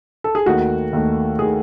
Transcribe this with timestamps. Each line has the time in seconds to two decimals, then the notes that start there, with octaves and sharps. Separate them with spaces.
0.24 A4
0.35 G#4
0.46 D#2 D#3 A3 F#4
0.93 D#2 D#3 A3
1.39 D#3 A3 G#4